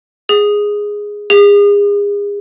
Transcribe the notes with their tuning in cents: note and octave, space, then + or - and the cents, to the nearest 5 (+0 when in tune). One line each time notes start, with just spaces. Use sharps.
G#4 -5
G#4 -35